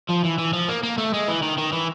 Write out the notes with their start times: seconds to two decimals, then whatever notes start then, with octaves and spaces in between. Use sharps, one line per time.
0.09 F3
0.24 E3
0.38 E3
0.53 F3
0.69 A#3
0.83 A#3
0.98 A3
1.13 G#3
1.28 E3
1.42 D#3
1.58 D#3
1.72 E3